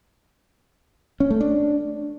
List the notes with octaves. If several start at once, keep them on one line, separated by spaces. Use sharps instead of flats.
C#4
A3
D4